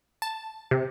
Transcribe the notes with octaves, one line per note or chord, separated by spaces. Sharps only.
A5
C3